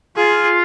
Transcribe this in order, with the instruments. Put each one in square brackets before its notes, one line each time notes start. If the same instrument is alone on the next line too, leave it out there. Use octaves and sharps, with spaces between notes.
[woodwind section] F4 [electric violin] G#4